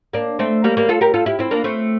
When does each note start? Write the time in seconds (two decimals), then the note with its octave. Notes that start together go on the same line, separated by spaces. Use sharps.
0.13 A#3 D4
0.39 A3 C4
0.64 G3 A#3
0.77 G3 A#3
0.89 F4 A4
1.01 G4 A#4
1.14 F4 A4
1.26 E4 G4
1.39 C4 E4
1.51 A#3 D4
1.64 A3 C4